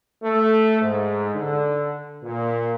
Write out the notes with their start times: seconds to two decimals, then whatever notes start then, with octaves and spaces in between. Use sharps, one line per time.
0.23 A3
0.81 G#2
1.35 D3
2.23 A#2